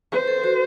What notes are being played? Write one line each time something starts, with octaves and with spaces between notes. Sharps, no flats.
B4 C5
A4
F#4